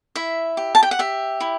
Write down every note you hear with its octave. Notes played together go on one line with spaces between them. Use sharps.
E4 E5
G4
A5
G5
F#5
G4 E5
E4